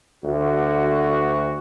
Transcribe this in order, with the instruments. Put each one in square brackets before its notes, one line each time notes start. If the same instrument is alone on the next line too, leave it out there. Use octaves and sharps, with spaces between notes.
[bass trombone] D2 [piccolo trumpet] F#4